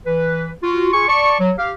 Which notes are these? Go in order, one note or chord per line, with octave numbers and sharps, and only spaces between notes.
E3 B4
F4 F#4
F4 G#4 G#5 C#6
D5 A5 C#6
F#3
G4 F5